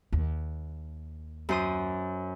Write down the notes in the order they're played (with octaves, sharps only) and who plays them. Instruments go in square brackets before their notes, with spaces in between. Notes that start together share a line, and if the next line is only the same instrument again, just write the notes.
[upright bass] D#2
[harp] F#2 C5 D#6